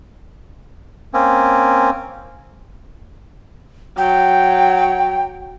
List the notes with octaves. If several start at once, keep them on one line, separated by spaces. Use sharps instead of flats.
A#3 C4 C#4
F#3 G5